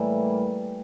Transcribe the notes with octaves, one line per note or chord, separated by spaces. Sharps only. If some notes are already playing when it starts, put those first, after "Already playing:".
Already playing: A2 E3 G3 A#3